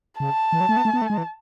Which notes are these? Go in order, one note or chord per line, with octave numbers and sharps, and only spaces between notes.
C#3 A5
E3
F#3
A3
B3
A3
B3
A3
G#3
E3